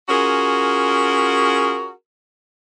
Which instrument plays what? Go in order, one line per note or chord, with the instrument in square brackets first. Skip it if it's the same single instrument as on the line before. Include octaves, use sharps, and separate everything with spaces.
[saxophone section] C#4 F4 F#4 G#4 A#4